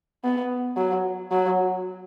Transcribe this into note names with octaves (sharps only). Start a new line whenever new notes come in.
B3
F#3
F#3